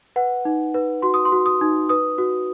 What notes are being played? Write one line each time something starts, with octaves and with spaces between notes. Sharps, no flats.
B4 F#5
D#4
B4
F#4 C6
D#6
C6
F#4
D#6
D#4
B4 D#6
F#4